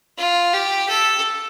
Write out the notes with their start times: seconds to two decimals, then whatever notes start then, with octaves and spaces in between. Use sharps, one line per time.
0.18 F4
0.54 G4
0.89 A4